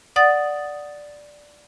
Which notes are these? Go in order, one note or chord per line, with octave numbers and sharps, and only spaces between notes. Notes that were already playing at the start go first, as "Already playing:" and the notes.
D5 F#5 D#6 A6